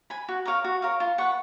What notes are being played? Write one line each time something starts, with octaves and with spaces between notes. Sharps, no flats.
G#5 B5
F#4
A#4 C#5 F5
F#4
A#4 C#5 F5
F4
B4 F#5 C#6